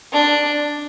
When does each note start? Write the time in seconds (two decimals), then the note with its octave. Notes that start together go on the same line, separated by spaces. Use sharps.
0.12 D4